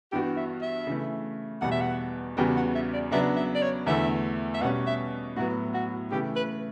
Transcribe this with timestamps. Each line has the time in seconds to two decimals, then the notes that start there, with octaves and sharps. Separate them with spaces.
0.12 G2 E3 B3 F#4 G4
0.37 E5
0.62 E5
0.87 C#3 E3 A3
1.61 E2 B2 G3 F#5
1.71 E5
1.81 F#5
2.37 E2 C#3 G3 B3 F#4 G5
2.56 F#5
2.75 E5
2.93 D5
3.11 C#3 F#3 B3 D4 E5
3.36 E5
3.55 D5
3.62 C#5
3.87 E2 D3 A3 E4 E5
4.54 E5
4.61 B2 G3 C#4 F#5
4.87 E5
5.36 A2 F#3 B3 F#4
5.74 F#4
6.11 C#3 E3 A3 G4
6.36 B4